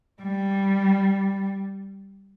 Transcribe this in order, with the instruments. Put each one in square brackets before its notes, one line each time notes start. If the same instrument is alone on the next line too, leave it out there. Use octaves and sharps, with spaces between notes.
[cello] G3